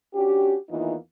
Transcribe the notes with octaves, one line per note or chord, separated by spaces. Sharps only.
C#4 D4 F#4 G4
E2 D#3 E3 A#3 D#4 F4